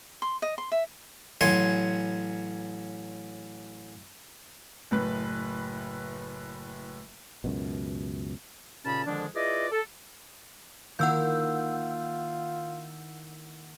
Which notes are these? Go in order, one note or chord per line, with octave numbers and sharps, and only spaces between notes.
C6
D#5
C6
E5
A1 F#3 G#5 C6
F#1 A2 B4
C#2 F#2 B2
D#2 A#2 C#3 C#4 A5 B5
F2 D3 D#3 F3 G#3 D4
E4 F4 G#4 B4 D5 D#5
A4
D#3 A#3 E4 F4 F#5 E6 G6